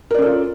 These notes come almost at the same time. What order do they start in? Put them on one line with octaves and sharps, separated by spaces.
A#4 D5 C#4 A4 F4